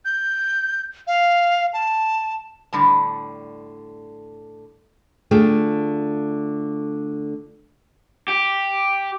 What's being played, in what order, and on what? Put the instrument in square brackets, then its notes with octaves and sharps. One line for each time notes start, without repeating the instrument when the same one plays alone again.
[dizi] G6
F5
A5
[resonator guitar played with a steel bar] A2 D3 G3 A5
[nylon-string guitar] D3 A3 F4 G#4 G5
[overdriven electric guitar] G4